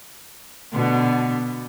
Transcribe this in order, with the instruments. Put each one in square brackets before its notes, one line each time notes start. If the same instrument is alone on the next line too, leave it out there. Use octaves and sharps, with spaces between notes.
[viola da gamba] B2 D3 B3